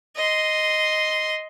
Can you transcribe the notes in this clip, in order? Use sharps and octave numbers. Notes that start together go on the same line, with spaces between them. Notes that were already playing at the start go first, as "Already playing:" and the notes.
D#5 C6